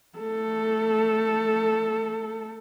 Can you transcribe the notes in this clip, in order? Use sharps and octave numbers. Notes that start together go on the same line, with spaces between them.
A3 A4